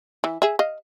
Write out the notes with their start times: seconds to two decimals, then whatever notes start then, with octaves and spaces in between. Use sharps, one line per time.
0.24 E3
0.42 G#4 E5
0.59 D#5 F5